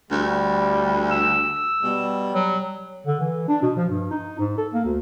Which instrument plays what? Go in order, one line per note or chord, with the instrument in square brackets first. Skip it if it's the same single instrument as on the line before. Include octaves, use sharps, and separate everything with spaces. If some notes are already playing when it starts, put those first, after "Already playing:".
[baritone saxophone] D2 [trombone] G3
[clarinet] E6
[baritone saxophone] B2 [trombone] G3
[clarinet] F#3
[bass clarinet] D3
E3
D4
B2
F3
G2
D#4
G#2
A4
A#3
D2